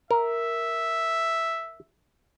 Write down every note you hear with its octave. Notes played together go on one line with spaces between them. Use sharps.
A#4 E5